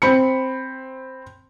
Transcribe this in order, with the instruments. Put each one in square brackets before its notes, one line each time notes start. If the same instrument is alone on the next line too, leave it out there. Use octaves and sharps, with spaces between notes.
[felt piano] C4 B5 C#7